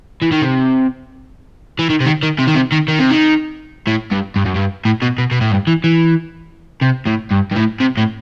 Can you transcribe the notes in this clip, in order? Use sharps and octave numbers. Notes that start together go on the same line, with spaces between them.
E3
D#3
C3
E3
D#3
C3
D#3
D#3
C3
D#3
C3
D#3
D#3
C3
D#3
A2
G2
G2
F#2
G2
A2
B2
B2
B2
A2
G2
E3
E3
C3
A2
G2
G2
A2
C3
A2